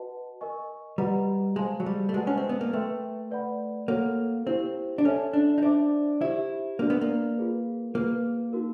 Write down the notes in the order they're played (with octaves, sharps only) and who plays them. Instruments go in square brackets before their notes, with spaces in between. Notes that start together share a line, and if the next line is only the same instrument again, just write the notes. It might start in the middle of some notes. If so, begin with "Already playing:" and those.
Already playing: [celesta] F#4 B4 D#5 F#5 A5
A#4 D#5 G#5 C#6
[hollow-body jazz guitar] G3 [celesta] F#4 B4 D#5 F#5 A#5
[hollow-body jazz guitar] G#3 [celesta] C5 F5 A5 C6
[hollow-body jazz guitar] F#3
G3
A3
[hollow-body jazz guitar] G#3 [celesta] F#4 B4 D5 F#5 A5
[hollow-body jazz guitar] C#4
C4
B3
A#3
[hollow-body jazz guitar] A3 [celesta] B4 E5 G5 C6
[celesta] B4 D5 F#5 B5
[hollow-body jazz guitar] A#3 [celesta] F#4 A4 C#5 F#5
[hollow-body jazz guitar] C4 [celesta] E4 G4 C5 F5
[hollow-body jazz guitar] D4
[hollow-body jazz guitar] C#4 [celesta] A4 C#5 E5 A5
[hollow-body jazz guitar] D4
D#4
[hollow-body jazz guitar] D4 [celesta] C5 E5 A5 D6
[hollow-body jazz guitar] E4 [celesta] G4 C5 E5
[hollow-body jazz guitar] A#3 [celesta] D4 F#4 A#4 D5
[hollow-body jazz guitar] B3
A#3
[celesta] F4 G#4 B4
[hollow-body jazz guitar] A#3 [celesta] F4 G#4 B4
[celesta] D#4 F#4 A#4